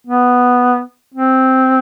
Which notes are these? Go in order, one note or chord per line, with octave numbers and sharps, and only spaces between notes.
B3
C4